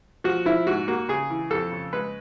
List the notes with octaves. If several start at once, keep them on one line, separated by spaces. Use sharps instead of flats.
F3 F#4
F3 E4
G#2 F#4
A#3 F#4
C#3 G#4
E3
F2 A4
C#3
G#3 B4